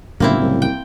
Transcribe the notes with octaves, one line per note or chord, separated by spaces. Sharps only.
G1 A2 C#3 F#3 A#3 C4 E4
C2
G5